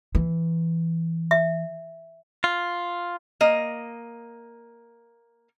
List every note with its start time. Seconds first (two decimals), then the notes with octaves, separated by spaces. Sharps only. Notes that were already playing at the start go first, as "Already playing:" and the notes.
0.15 E3
1.31 E5
2.44 F4
3.41 A#3 D#5